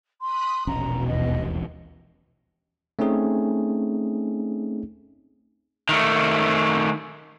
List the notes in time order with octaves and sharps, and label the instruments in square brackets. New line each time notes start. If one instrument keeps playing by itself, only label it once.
[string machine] B5 D#6 F#6 [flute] C6
[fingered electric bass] E1 A#1 C#4 [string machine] B2 [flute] A#5
[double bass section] D#2 E3 [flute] D#5
[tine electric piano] A3 C4 C#4 D#4 G#4
[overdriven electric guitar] D#3 A3